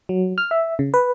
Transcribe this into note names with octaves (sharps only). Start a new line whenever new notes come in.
F#3
F6
E5
C#3
B4